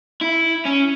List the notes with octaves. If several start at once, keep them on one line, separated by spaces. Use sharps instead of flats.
E4
C#4